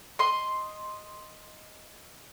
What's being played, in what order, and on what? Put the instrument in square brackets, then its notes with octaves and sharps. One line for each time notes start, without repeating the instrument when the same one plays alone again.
[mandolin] D#5 C6